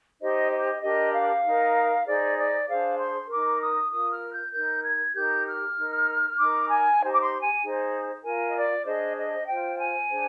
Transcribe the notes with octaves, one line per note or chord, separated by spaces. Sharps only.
D#4 G4 C5 D#5
D#5
D4 G4 A#4 D#5
F5
D#4 A#4
D#4 G#4 C5 D5
D5
D4 G#4 C5 F5
C6
D#4 A#4 D6
D#6
F4 A#4 D#6
F6
G6
D#4 A#4 G6
G#6
D#4 G4 A#4 G6
F6
D#4 A#4
D#4 A#4 D6
G#5
D#4 G4 C5
D6
C6
G#5
D#4 G#4 C5
F4 A#4 G#5
D#5
D5
D4 G#4 C5 D#5
D#5
F4 C5 G5
G#5
D4 G#4 C5